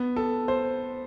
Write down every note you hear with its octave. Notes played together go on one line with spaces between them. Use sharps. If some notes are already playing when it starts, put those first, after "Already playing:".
Already playing: B3
A4
C5